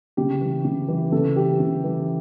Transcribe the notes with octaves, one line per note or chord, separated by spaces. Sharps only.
C#3 G4
E3 G3
C#3
E3 G3
C#3 A4
E3 G3 G4
C#3
E3 G3